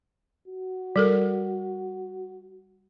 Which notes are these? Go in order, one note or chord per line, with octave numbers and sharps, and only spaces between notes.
F#4
G3 A4 A#4